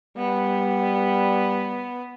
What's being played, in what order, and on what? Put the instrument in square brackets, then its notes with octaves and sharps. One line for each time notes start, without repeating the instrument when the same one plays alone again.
[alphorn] G3 [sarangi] B3